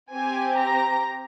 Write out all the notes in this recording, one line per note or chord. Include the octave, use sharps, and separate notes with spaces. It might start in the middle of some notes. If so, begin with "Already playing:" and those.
C4 G4 G#5
A#5